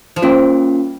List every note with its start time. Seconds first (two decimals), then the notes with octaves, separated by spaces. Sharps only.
0.16 F3
0.22 G3 A#3 C#4 F4